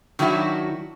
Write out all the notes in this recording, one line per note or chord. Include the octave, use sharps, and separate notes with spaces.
D#3 F#3 D4 E4 F#4